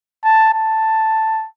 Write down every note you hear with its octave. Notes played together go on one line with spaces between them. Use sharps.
A5
A5